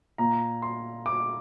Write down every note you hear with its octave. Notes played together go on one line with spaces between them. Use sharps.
A#2 A#5
C6
D6